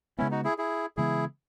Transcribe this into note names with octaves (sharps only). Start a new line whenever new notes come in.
C#3 G#3 B3 C#4 E4
D#4 F#4
E4 G#4
E4 G#4
C#3 E3 G#3 B3 E4 G#4